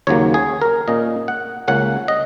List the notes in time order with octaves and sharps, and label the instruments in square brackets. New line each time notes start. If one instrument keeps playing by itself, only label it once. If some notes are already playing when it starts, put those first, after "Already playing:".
[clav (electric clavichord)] D#2 C#3 F#3 A#3 C#5
G#4
A#4
A#2 A#3 C#4 D#5
F#5
C#2 C#3 A#3 C#4 F#5
D#5